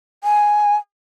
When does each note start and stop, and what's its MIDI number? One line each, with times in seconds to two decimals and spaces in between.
0.24 0.76 80